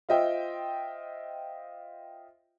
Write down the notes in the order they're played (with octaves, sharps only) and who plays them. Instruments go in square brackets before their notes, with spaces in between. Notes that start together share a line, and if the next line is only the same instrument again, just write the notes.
[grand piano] F4 C5 D#5 E5 G5